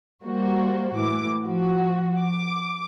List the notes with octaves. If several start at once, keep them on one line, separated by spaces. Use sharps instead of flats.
G3 A#3 F#4 C5
A2 E3 D6
F3 F#4
D6